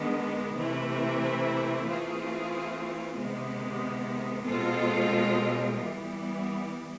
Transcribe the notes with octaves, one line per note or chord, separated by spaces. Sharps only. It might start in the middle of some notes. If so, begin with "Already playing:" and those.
Already playing: D#3 G#3 B3 D4
C3 E3 A3 C4 E4
E3 A3 C4 F4 G#4
C3 D#3 G#3 B3
B2 G#3 C4 F4 A4
E3 G3 B3